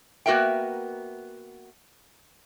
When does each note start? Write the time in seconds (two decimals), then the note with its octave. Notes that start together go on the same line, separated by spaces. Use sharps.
0.26 A#3 B3 F#4 A#4 E5 G5